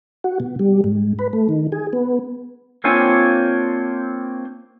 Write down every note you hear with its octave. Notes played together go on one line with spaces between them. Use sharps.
F#4
B2
G3
G#2
B4
A3
D#3
G#4
B3
A#3 C4 D4 F4 C#5 G#5